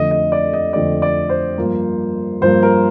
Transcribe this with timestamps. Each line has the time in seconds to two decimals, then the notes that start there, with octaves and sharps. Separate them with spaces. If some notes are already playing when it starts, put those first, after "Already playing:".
Already playing: F2 D3 A3 D#5
0.11 D#5
0.32 D5
0.53 D#5
0.73 F2 D3 A3 D5
1.02 D5
1.29 C5
1.58 G2 F3 A#3
2.41 G2 F3 A#3 C5
2.63 A#4